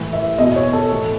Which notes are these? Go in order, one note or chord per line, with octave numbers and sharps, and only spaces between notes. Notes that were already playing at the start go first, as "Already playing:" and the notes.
Already playing: A2 E3
E5
E2 B2 D#5
C#5
A4
A2 E3